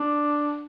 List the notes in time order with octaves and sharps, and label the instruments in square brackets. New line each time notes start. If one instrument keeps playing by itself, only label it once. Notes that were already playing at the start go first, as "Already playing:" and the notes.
Already playing: [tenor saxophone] D4